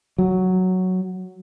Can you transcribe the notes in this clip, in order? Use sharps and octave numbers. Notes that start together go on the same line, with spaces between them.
F#3